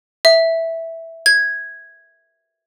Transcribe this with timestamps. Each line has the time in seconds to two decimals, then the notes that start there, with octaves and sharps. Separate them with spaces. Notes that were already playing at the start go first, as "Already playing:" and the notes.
0.25 E5
1.26 G#6